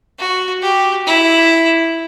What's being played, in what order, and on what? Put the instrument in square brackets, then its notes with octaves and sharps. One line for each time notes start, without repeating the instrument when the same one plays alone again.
[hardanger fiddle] F#4
G4
E4